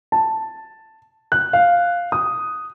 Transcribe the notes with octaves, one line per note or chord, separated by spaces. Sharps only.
A5
F#6
F5
D#6